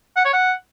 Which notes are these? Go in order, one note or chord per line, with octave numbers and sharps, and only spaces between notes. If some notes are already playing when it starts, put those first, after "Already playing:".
F#5
C#5
F#5